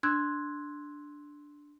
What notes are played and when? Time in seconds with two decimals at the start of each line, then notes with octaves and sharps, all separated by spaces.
0.03 D4 C6 E6 F#6 G#6